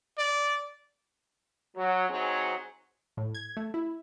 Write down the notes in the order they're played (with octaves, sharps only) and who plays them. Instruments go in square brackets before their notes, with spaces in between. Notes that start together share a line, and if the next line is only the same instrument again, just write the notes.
[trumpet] D5
[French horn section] F#3
F#3 C4 D#4 G#4 C5 C#5
[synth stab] A2
G#6
A3
E4